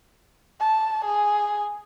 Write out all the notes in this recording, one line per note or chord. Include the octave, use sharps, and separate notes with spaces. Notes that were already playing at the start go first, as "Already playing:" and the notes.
A5
G#4